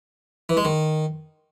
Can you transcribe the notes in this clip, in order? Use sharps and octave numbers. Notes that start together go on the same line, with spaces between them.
E3
G#3
D#3